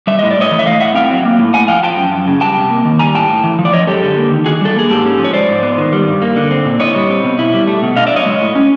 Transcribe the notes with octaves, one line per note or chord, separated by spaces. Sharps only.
G3 E5
A2 D#5
D5
A2 C#5 D#5
E3
E5
A3 D#5 F5
A2 E5 F#5
C4 F5 G5
F#3
A#3
A2
A2 F#5 G#5
F3 F5 G5
F3 G5 A5
F#2
F#2
C#3
G3 G5 A5
C3
A#3
D#3
G3 G#5 A#5
A2 G5 A5
A2
E3
F3
D5
F#2 C#5 D#5
G#3 G4 A4
D3
A#3
D#3
D#3 F#4 G#4
G3 A4
A#3 G#4
G#2 G4 A4
C#4
F3
C#5
G#3 C5 D5
G#2
B3
D#3
G3
G2
A#3
D3
C4
A#2
E4 C#5 D#5
G3
C4
B2
E4
G3
A3
B2
D4 D#5 F5
D5 E5
F#3 C#5 D#5
G#3
A2
C#4